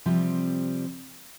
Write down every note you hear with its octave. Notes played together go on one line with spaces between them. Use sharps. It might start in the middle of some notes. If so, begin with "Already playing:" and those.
C3 F3 G3 C4